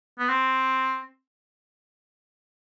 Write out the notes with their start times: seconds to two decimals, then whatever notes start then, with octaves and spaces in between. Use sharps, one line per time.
0.19 B3
0.29 C4